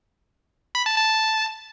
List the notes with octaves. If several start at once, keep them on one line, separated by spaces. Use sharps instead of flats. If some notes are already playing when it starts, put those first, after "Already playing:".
B5
A5
A5